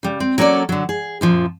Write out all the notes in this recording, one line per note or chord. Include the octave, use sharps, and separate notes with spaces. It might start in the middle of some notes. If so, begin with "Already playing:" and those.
C#3 G3
C4
F#3 A#3 C#4 A4 D5
D3 F#3
G#4
F#2 A#2 F3